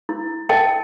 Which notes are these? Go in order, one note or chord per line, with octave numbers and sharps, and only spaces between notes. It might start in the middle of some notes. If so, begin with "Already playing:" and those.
E4
A#4 D#5 G5 A5